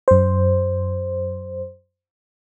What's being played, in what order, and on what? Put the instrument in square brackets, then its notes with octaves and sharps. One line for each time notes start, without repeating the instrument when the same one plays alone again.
[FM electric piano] F#2 C5